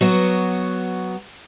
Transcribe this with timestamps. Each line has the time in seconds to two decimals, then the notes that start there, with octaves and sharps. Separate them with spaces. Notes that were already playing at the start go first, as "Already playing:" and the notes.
0.01 F#3 B3 F#4